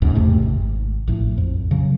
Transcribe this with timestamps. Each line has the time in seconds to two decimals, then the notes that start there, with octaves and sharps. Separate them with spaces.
0.02 A#1 D#2 G#2 C#3
0.15 E2 G#2 C3 A3
0.42 G#1
1.08 A#1 A2
1.38 F2
1.71 C#3 F#3